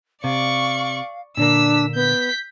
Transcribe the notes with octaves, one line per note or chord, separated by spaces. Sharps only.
C3 D5 F5 C#6
A#2 D3 A#3 D4 E6 B6
B3 G6 B6